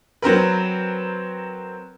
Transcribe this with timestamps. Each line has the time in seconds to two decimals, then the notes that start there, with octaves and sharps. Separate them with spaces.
0.22 F#3 C4 A#4 B4